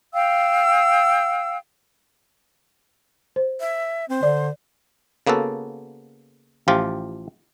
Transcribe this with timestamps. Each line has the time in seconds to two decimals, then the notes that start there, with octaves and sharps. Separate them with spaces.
0.14 F5 G5 E6
3.36 C5
3.60 E5
4.10 C4 C5
4.23 D3 D5
5.27 C#3 A#3 B3 F#4 A4
6.68 A1 F3 F4 G4